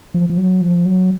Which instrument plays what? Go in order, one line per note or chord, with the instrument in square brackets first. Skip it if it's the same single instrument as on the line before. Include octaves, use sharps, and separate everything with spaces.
[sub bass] F3
F3
F#3
F3
F#3